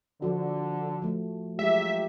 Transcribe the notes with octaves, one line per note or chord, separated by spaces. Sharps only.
D3 F3 F#4
F3 A3
F#3 G#3 F4 G4 E5